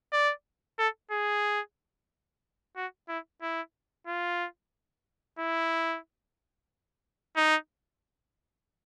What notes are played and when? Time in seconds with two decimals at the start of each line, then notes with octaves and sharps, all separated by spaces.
0.13 D5
0.79 A4
1.11 G#4
2.76 F#4
3.09 E4
3.42 E4
4.07 F4
5.39 E4
7.36 D#4